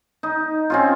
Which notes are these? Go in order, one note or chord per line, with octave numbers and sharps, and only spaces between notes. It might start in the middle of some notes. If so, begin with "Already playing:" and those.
D#4
C4 C#4 F4